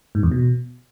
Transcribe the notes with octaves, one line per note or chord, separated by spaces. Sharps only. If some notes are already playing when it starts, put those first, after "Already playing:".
G#2
E2
B2